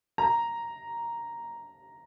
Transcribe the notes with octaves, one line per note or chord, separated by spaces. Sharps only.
A#5